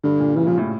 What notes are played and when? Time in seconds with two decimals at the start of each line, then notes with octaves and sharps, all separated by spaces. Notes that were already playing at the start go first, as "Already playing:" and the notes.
0.04 G2 D3
0.20 A#2
0.36 C#3 E3
0.47 A#2 F3
0.58 A2